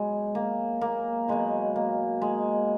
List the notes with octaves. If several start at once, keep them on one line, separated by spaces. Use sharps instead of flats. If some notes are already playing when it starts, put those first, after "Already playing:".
Already playing: B2 F#3 G#3
A#3
A#3
B2 F#3 G#3
A#3
G#3